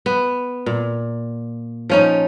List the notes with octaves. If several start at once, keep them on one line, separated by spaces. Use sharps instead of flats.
B3
A#2
F3 C#4 D#4